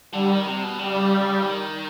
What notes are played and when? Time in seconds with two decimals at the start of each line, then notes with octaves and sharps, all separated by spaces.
0.13 D3 G3
0.30 D#3
0.45 C3
0.63 B2
0.79 C#3 G3
1.41 E3
1.45 D#3